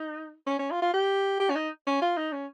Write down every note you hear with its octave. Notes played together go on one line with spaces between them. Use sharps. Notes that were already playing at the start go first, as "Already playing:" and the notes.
Already playing: D#4
C#4
C#4
F4
F4
G4
G4
C#4
D#4
C#4
F4
D#4
C#4